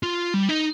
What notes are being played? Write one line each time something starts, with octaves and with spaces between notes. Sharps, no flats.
F4
G3
D#4